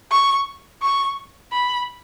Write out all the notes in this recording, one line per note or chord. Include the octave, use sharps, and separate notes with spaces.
C#6
C#6
B5